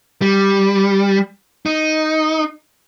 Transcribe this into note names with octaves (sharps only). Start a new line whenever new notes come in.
G3
D#4